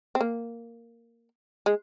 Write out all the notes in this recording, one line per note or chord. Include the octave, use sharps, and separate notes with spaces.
C4
A#3
G#3